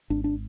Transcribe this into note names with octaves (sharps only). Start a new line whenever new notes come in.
G#1 D4
D4